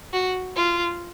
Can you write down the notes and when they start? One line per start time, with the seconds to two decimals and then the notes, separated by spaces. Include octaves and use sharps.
0.13 F#4
0.56 F4